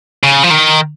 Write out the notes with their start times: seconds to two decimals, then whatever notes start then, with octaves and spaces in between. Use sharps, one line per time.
0.23 C#3
0.43 F3
0.50 D#3